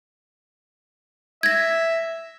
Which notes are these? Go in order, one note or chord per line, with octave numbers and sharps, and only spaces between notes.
E5 G#6 A#6